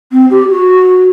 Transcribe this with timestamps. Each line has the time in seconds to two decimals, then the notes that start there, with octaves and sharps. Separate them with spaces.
0.12 C4
0.31 G4
0.49 F#4